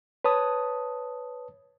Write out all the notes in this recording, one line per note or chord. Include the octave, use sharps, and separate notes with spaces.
B4 C#5 A5 D#6